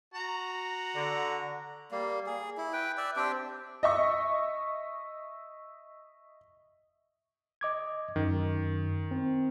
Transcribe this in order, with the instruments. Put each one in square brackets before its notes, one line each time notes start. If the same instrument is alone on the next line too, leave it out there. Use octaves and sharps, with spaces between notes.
[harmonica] F#4 A#5
[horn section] D3
[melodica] G3 A#3
G#4
E4
B4 G5
D5 E5
C4 D4 G4 G5
[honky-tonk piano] D#5 E5 C#6
[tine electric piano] D#5 D6 G#6
[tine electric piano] F#2 [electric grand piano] D#3
[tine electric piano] C4